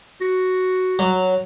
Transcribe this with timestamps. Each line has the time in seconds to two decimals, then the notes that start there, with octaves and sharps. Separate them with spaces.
0.21 F#4
0.99 F#3